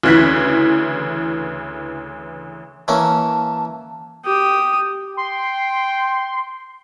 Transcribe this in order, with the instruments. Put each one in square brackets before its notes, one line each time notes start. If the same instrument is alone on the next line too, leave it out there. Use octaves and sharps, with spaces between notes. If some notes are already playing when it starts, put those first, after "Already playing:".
[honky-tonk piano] D2 C#3 E3 F#6 B6
[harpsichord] E3 A#3 C#4 [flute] A5
[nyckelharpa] G4 D#6
[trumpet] G5 [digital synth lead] C6